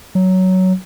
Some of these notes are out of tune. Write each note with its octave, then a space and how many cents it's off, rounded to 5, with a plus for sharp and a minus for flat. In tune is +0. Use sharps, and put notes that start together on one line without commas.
F#3 +10